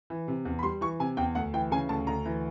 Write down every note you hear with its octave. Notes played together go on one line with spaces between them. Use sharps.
E3
C3
E2
B5
G3 C6
E3 C#6
C3 G#5
E2 G5
D2 F#5
E3 G5
C#3 G#5
D2 A5
D2 A#5
E3